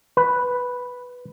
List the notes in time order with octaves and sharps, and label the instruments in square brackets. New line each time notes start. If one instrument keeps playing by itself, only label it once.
[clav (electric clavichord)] B4